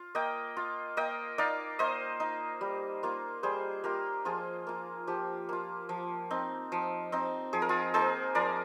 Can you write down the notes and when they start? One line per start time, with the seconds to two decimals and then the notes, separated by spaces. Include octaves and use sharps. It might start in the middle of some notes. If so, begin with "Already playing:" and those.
Already playing: F4
0.15 A#3 D#5 G5
0.57 F4
0.97 A#3 D#5 G5
1.38 D#4 D5 F5
1.79 A#3 C5 D#5
2.20 D#4
2.61 G3
3.03 A#3 F4
3.43 G3 G#4 C5
3.84 A#3 F4 G4 A#4
4.25 F3 F4 G#4
4.67 A#3 F4
5.07 F3 G4
5.49 A#3 F4
5.89 F3
6.30 C4 D#4
6.72 F3
7.12 C4 D#4
7.53 F3 G#4
7.62 A#4
7.69 F4 G#4
7.94 A#3 D#4 G#4 C5
8.35 F3 A#4 D5